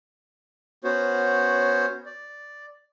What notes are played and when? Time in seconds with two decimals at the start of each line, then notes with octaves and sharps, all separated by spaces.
0.84 B3 C#4 F#4 C5 C#5
2.06 D5